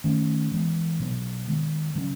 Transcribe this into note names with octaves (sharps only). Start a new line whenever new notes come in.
D#3 A3 C#4
E3 G#3 B3
B2 F#3 B3
D#3 G#3 B3
C#3 F#3 C#4